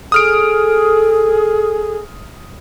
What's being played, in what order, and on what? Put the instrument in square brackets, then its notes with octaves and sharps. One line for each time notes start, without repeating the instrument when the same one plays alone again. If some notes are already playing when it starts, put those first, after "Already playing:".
[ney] G#4 [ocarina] A4 [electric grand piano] D#6 F6 D7